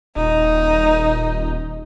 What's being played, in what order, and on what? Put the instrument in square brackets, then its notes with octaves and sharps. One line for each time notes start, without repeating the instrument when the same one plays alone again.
[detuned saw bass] D#1 [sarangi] D#4